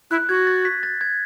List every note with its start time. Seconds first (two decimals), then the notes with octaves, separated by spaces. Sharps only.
0.11 E4 F#6
0.29 F#4 G#6
0.47 A6
0.65 B6
0.83 A6
1.01 G#6